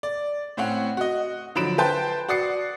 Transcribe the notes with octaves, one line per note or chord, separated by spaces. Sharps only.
D5
A2 C4 C#4 F#5
F#4 D#5
D3 F3 F#3 B5 D7 E7
B4 C5 G5 A5
F#4 D5 D#6 C7 C#7